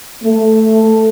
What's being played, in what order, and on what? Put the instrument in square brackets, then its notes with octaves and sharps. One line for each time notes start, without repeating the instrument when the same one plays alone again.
[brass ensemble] A3